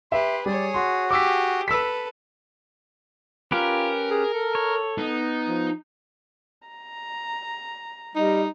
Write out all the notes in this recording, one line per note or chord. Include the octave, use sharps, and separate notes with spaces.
G4 B4 E5 C6
G3 G#4 C#5 D5
F#4 C6
G4 G#4 D6 E6 B6
A4 B4 E6 B6
C#4 F4 G4 A#4 B4
G#4
A4
C#5
B3 D#4
F3
A#5
G3 D#4 D#5